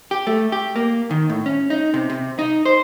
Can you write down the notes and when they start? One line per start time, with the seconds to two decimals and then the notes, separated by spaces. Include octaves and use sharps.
0.11 G4
0.27 A3
0.52 G4
0.76 A#3
1.11 D#3
1.30 A2
1.46 C#4
1.70 D#4
1.94 C3
2.10 C3
2.39 D#4
2.65 C5